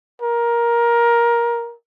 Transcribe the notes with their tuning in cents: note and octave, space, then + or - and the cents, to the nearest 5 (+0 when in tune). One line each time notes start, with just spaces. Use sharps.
A#4 +15